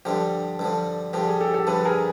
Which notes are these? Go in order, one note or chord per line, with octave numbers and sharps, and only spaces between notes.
G2 D3 F3 G4
G2 D3 F3
G2 D3 F3 G4
G#4
G4 A4
G4 A4
G2 D3 F3 A4 B4
G#4 A#4